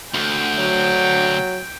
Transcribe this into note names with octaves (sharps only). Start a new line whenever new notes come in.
D2 G5
F#3